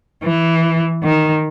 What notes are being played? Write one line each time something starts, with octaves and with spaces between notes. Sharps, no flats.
E3
D#3